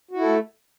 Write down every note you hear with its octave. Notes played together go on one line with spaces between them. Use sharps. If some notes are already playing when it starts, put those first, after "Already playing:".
A3 E4 F#4 A4